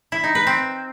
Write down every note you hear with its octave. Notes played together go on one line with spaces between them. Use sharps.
E4
D#4
B4
C4